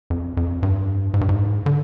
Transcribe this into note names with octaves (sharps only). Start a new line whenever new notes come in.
F2
F2
G2
G#2
G2
G#2
D3